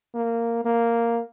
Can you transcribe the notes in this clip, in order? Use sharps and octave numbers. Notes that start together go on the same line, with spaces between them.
A#3
A#3